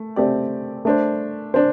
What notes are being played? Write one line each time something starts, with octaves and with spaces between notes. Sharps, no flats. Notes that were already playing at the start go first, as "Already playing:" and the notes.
Already playing: A3
A3 C4 G4 D5
A3 D4 C5
D4 C5